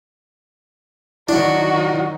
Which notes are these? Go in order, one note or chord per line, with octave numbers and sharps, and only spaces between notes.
D#3 F#3 D4 E4 F#4